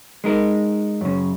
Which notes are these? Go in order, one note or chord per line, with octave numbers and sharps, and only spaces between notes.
G#3 D#4 A#4
F#2 C#3